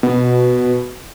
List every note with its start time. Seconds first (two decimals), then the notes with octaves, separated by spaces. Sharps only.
0.03 B2